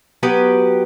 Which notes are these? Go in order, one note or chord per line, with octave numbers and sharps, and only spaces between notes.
F#3 B3 G4 B4